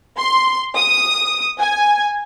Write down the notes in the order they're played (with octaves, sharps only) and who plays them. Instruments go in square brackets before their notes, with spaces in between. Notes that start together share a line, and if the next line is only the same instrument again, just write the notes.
[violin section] C6
D#6
G#5